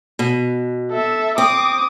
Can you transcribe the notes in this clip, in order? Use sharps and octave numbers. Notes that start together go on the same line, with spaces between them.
B2
A4 E5
C4 D6 D#6